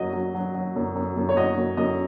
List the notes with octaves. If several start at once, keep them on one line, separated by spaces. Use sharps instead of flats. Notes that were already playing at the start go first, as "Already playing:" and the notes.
Already playing: F#2 F#3 D#5
F#3
F#3
F#3
F#2
F#2
F#2
C#5
F#3 D#5
F#2
F#2 D#5